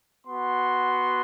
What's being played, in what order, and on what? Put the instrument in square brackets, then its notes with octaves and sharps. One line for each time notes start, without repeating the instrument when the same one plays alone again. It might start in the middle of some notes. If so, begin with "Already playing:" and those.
[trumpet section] B3 F#4 C6